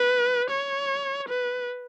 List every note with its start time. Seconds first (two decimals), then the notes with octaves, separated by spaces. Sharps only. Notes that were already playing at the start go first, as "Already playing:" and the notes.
Already playing: B4
0.50 C#5
1.29 B4